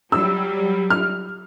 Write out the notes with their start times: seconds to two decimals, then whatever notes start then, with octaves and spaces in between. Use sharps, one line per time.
0.12 F#3 G3 E6
0.90 F6